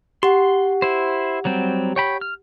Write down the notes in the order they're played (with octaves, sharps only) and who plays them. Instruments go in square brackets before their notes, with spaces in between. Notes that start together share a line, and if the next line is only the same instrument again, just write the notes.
[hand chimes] G4 F#5 [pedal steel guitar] C6
[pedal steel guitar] E4 C5
F#3 G3 C4
C#5 G5 B5
F6